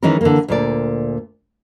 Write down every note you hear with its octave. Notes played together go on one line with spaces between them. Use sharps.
D#3 E3 G#3 C#4 D#4 A#4
D3 E3 A#3
D2 A#2 D5